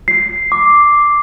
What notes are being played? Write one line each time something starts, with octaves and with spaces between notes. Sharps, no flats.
C7
D6